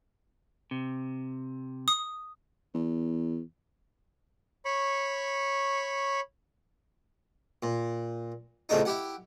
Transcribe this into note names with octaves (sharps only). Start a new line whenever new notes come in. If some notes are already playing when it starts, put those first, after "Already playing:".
C3
D#6
E2
C#5 B5 C#6
A#2
F2 A2 C#3 A3 D4 D#4
E4 G4 F#5